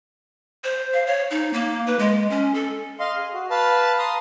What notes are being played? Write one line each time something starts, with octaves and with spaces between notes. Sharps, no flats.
C5
F5
C#5
D#4
A#3
B4
G#3
C#4
A4
D#5 F5 C6
G#4
F#4
B4 F5 A5
A#5 C6 D#6